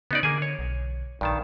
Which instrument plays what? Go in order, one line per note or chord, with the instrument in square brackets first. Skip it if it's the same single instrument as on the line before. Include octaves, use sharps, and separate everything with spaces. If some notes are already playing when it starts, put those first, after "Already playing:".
[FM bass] C#3 [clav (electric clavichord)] B3 D#4 D5
[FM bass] D3 [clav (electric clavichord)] A#3 G#4 G#5
[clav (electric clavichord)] C#5
[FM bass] B1
[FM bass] A#1 [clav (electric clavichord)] G2 D#3 A5